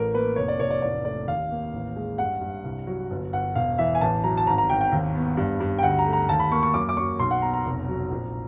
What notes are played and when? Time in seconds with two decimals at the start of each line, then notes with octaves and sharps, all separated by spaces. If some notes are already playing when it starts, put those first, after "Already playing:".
Already playing: A1 A3 A#4
0.14 A#3 B4
0.36 F1 C#5
0.48 D5
0.60 F1 C#5
0.70 D5
0.82 A1 D5
1.05 A3 D5
1.28 D#2 F5
1.50 A#3
1.73 A1
1.96 G#3
2.18 G2 F#5
2.41 G2
2.64 C2
2.87 F#3
3.10 G1
3.33 G1 F#5
3.55 E1 F5
3.78 E3 E5
3.95 G#5
4.01 A1 A5
4.24 F#3 A#5
4.37 A5
4.47 G#1 A#5
4.58 A#5
4.70 G#1 G5
4.81 G5
4.92 D#2
5.15 B3
5.37 G2
5.60 G2
5.79 G5
5.83 D2 F#5
5.99 A#5
6.06 A3
6.13 A#5
6.29 D#2 A5
6.40 B5
6.51 A#3 C#6
6.63 C#6
6.74 F#2 D6
6.89 D6
6.97 F#2 C#6
7.19 B1 C6
7.31 F#5
7.42 B3 A#5
7.54 A#5
7.66 F1
7.88 F#3
8.10 A#1